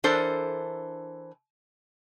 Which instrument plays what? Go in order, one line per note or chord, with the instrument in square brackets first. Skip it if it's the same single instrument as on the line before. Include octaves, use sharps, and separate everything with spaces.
[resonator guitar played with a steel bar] E3 D4 A4 A#4 C5